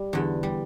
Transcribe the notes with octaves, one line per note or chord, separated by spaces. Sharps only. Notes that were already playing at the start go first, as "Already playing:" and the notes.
Already playing: G3
E2 D3
G3